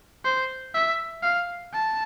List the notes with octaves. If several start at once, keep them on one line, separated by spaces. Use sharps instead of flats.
C5
E5
F5
A5